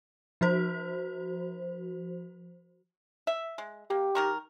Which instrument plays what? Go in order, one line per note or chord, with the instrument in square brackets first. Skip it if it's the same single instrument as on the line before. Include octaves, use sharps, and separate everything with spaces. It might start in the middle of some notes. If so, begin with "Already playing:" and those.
[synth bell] F3 F#4 C5
[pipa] E5
G#3
[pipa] A#3 [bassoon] G4
[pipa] D#3 A#4 C#6